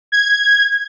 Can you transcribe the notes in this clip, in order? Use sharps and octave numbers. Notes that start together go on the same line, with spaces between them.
G#6